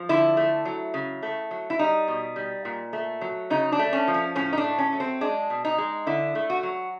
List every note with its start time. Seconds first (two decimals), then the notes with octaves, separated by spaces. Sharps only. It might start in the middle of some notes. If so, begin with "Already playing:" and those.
Already playing: F3
0.09 D3 E4
0.37 A3
0.65 F#3
0.94 C#3
1.23 A3
1.51 F#3
1.70 E4
1.79 G3 D#4
2.08 B2
2.36 G3
2.65 A#2
2.93 A3
3.21 F#3
3.50 C#3 D#4
3.72 D4
3.79 A3
3.93 C#4
4.08 F3
4.14 C#4
4.35 A2 C#4
4.53 D#4
4.58 D4
4.64 A3
4.78 C#4
4.93 F#3
5.00 C4
5.21 G#3 D4
5.50 B2
5.65 D#4
5.78 G#3
6.07 D3 E4
6.35 A3
6.50 F#4
6.63 F#3